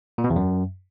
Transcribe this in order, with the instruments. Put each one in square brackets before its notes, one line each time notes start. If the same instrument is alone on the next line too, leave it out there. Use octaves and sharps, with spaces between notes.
[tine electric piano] A#2
B2
E2
F#2